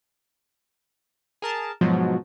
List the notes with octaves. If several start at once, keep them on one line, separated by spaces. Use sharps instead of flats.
G#4 A#4 A5
G#2 B2 F3 F#3